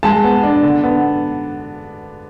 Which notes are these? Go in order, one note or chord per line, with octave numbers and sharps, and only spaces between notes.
G#3 A5
B3
D4
D3
B3